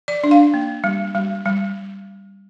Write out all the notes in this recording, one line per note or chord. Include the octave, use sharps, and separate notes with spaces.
D5
D4
F5
A#3
G3
G3
G3